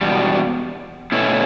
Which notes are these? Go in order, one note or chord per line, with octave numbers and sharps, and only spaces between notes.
E2 B2 G3
B2 A3 C#4 E4